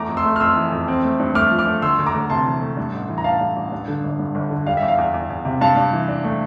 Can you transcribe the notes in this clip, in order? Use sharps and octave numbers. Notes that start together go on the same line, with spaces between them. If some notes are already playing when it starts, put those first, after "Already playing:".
Already playing: E2 A3 A#5 D6
F2
C6 E6
A3
F6
F2 C6 E6
E3
F2
C4
A3
G2
A3 D6 F6
F3
D6 F6
A3
D2 C6 E6
D2
A#5 D6
D2
C3 A5 C6
E3
A3
G2
A1
E3
A#5
A1 F5 A5
G2
A1
G2
D3
G1
G2
G1
D3
G3 F5
E5
E2
F5
E2
E2
E2
C3
G2 F5 A5
G2
E3
D4
A3